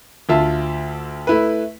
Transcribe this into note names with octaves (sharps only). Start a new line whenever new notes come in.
D2 F4 E5 A5
A3 E4 B4